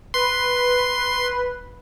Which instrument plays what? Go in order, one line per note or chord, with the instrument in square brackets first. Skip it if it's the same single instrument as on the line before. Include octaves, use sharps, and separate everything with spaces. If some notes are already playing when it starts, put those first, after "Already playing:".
[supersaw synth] B4 [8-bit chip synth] C6